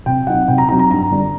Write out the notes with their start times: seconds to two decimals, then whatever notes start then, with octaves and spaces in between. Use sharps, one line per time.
0.06 C3 G5
0.27 F#3 C4 D#4 F#5
0.48 C3 G5
0.58 A#5
0.69 F#3 C4 D#4 A#5
0.79 A#5
0.91 G2 A#5
1.11 D3 G3 D4